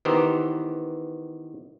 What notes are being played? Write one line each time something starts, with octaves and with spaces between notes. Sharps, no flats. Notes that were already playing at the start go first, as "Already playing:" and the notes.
D#3 E3 B3 G4 C5 A#5